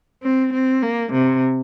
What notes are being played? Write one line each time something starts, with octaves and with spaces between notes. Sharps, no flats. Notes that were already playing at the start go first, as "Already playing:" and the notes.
C4
C4
A#3
C3